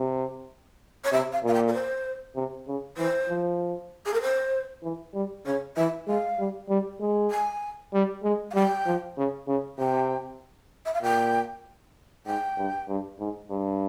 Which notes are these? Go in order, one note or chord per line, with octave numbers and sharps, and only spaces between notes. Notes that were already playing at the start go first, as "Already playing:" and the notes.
Already playing: C3
C#5
C3 E5
F5
A#2 F5
G5
A#4
C5
C3
C#3
E3 C5
F3
G#4
A#4
C5
E3
G3
C#3 C#5
E3 E5
G#3 F5
G3
G3
G#3
G#5
G3
G#3
F5
G3 G5
F3
C#3
C#3
C3 G5
E5
F5
A#2 G5
G#2 G5
G2
G2
G#2
G2